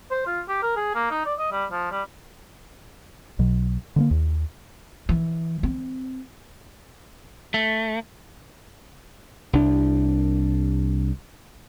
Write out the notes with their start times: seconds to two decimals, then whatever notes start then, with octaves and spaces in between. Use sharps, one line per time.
0.11 C5
0.26 F4
0.48 G4
0.62 A#4
0.76 G#4
0.95 A#3
1.11 D#4
1.25 D5
1.39 D#5
1.52 G3
1.72 F3
1.91 G3
3.39 B1 B2 F#3
3.96 D3 G#3 A#3
4.11 D#2
5.09 E3
5.63 C4
7.54 A3
9.53 C2 D4